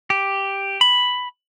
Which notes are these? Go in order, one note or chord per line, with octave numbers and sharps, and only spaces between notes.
G4
B5